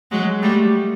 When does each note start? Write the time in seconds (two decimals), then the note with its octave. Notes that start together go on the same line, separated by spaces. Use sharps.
0.11 F#3 G#3
0.42 G3 A3